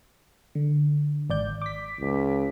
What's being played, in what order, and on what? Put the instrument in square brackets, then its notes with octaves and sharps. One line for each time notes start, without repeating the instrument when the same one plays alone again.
[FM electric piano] D3
G#1 D5 G6
D6 B6
[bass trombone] C#2